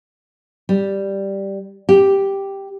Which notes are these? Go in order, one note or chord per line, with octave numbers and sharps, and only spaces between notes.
G3
G4